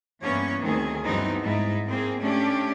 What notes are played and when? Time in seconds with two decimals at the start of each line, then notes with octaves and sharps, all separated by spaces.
0.22 G2 E3 A#3 B3 C#4 C#5
0.61 D2 D#3 C4 G#4
1.04 E2 G2 F#3 B3 C4 D#4
1.44 G#2 D#4 E4
1.88 A#3 C4 G#4
2.20 A3 C#4 D4 G4